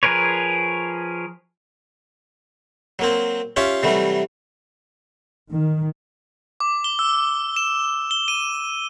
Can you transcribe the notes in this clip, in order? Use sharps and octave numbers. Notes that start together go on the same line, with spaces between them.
F3 G#4 A#4 B4 C#5
F#3 A#3 C4
C#4 F4 G4 C#5 E5 F5
C3 E3 F#3 G3 A3
D#3
D6
G7
E6
E7
G7
D#7